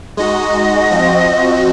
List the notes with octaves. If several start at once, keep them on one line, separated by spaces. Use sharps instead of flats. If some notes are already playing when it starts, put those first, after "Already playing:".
G#3 D#4 F#4 D#5
F3 C4 F#4